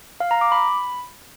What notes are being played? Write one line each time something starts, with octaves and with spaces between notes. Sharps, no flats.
F5
A#5
D6
B5